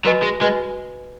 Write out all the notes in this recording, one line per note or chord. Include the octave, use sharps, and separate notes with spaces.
F#3 F#4 B4 D#5 G#5 B5
G#3
G#3 F#4 B4 D#5 G#5 B5